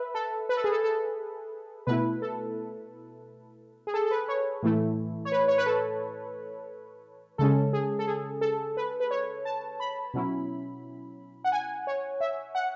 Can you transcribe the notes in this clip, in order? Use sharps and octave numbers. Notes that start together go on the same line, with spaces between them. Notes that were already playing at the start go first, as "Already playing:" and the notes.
Already playing: B4 E5
A4
B4
A4
G#4
A4
A4
B2 A3 E4 B4
A4
G#4
A4
A4
B4
C#5
A2 E3 A3 E4
C#5
B4
C#5
B4
A4
C#3 G#3 C#4 A4
G#4
A4
G#4
A4
B4
B4
C#5
A5
B5
B2 F#3 C#4 E4
F#5
G#5
C#5
E5
F#5